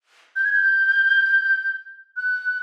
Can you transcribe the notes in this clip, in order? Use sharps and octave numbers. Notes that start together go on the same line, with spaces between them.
G6
G#6
G6
F#6